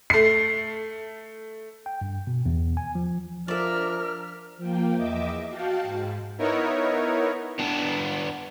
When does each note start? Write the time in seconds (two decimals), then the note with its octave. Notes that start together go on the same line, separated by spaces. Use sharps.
0.10 A3 C7
1.86 G5
2.01 G2
2.27 B2
2.46 E2
2.77 G#5
2.95 F3
3.48 F3 D4 A#4 D5 E5 F6
4.58 F3 A#3 G5
4.95 E2 D#5 E5 D6
5.48 F#4 F5 G5 A5
5.84 G#2
6.38 B3 D#4 E4 A#4 C#5
7.59 B3 D4